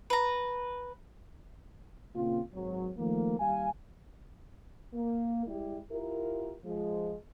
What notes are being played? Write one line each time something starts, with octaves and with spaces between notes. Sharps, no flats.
B4 A#5
A#2 C#3 A#3 C4 F4
G#1 F#3
D#3 F3 A3 A#3
D#2 G3 F5 G#5
A#3
G3 G#3 E4 G4
E4 F4 G4 A#4
F3 G#3